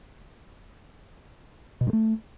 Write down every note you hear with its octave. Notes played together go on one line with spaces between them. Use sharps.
B2
G2
A3